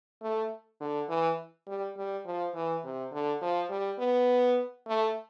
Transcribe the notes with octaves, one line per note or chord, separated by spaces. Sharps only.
A3
D3
E3
G3
G3
F3
E3
C3
D3
F3
G3
B3
A3